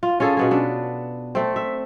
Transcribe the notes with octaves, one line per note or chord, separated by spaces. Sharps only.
F4
C#4 F4 G#4 A4
B2 B3 G#4
B3 D4 A4
A3 C4
E5